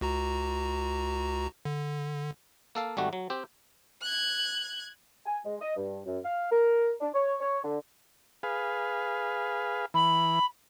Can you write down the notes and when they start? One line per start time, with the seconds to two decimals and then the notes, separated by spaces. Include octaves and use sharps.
0.01 C#2 F#4 A#5
1.65 D3
2.75 A#3 A4 F5
2.97 G#1 G3 A3 F#4
3.13 F#3
3.30 C4 G4
4.02 F#6 G#6
5.26 G#5
5.46 G#3
5.61 D#5
5.77 G2
6.05 F#2
6.24 F5
6.52 A#4
7.01 D4
7.14 C#5
7.41 C#5
7.65 D3
8.43 G#4 B4 F5
9.94 E3 B5